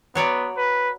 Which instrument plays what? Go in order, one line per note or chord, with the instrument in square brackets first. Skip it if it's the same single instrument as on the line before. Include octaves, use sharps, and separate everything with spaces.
[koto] F#3 C#5 D5 [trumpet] B3
[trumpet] B4